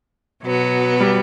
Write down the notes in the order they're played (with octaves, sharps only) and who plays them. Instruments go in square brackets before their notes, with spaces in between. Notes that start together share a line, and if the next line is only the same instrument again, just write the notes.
[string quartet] B2 F#3 B3
[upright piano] G3